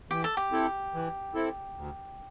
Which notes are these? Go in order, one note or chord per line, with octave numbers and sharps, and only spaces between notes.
E3 G4
A4
G4
C4 E4 A4
E3
C4 E4 A4
D2